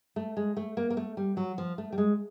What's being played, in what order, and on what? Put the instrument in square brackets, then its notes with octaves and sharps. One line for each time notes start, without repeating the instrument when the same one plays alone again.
[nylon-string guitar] A3
G#3
A3
A#3
A#3
A3
G3
F#3
F3
A3
G3
G#3